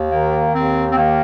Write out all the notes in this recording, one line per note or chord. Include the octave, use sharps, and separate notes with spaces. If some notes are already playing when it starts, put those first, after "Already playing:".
Already playing: D#2
D#3 A#3
D#2 C4
C4
D#3 A#3